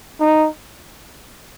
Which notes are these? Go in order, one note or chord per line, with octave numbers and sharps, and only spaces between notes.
D#4